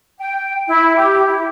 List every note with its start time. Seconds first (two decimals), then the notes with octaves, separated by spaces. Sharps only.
0.19 G5
0.67 E4
0.97 G4
1.26 E4